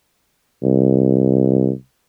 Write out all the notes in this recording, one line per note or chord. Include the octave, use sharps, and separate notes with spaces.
C2